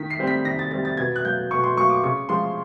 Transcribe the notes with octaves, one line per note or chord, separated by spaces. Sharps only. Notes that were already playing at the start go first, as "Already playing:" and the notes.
Already playing: D#3 B6
C7
G3 C4
B6
D#3 A#6
A6
G3 C4 A6
A6
B2 G#6
F#6
F#3 A#3 G6
B2 C#6
C6
F#3 A#3 C#6
D6
C#3 C#6
F3 G#3 C6